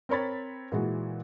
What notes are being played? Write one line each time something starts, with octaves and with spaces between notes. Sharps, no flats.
C4 A#4 C#5 B5 A6
A#2 E3 G#3 F#4